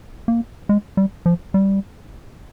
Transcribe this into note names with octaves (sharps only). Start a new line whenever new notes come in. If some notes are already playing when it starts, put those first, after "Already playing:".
A#3
G#3
G3
F3
G3